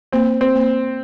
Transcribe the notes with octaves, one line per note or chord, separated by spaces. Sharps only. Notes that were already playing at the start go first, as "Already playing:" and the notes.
A#3 C4
C4
A#3